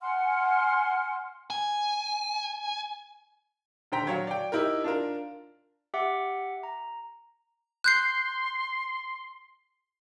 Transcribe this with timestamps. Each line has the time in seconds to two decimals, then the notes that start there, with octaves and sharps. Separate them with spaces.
0.01 F#5 G#5 C6 F6
1.50 G#5
3.92 D#1 D3 C5 G5 A#5 B6
4.07 F#3 C#5 F5
4.27 D5 G5
4.52 D#4 E4 G4 A#4
4.84 D4 F4 A#4
5.94 G4 E5 F#5 D6
6.63 A#5
7.84 C6 F#6 G6 C7